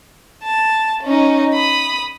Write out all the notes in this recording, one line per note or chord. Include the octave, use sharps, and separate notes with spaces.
A5
C#4 D#4
B5 D#6